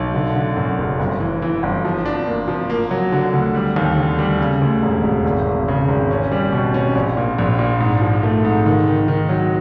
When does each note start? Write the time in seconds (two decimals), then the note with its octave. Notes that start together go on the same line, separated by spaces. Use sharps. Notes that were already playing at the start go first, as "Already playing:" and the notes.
Already playing: B1
0.14 D3
0.35 D3
0.56 F#2
0.78 F#1
1.00 G1
1.20 E3
1.42 E3
1.63 G1
1.85 F3
2.06 D4
2.27 A#3
2.48 F3
2.70 A#3
2.91 F#3
3.12 D3
3.33 D2
3.55 G3
3.76 D#2
3.98 D3
4.19 G3
4.40 C#3
4.62 D2
4.82 E1
5.03 E1
5.25 G#1
5.47 G#1
5.68 C#3
5.88 G#1
6.11 C#4
6.31 G3
6.52 B2
6.74 C#4
6.95 A#1
7.17 A#2
7.38 A#1
7.59 A#2
7.80 G#2
8.01 F3
8.23 A3
8.45 G#2
8.66 D#3
8.88 D#3
9.08 D#3
9.29 F#3